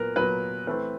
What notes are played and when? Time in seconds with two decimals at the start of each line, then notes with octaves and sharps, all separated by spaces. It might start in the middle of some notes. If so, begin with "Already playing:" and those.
Already playing: A#2 F#3 B3 A#4 B4
0.16 A#2 F#3 B3 B4
0.67 E3 A3 C4 B4